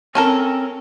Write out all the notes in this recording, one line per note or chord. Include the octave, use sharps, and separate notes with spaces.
C4 C#4 A4 A#4